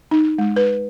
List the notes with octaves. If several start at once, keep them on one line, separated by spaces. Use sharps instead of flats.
D#4
G#3
B4